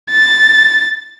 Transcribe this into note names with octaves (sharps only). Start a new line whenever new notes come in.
A6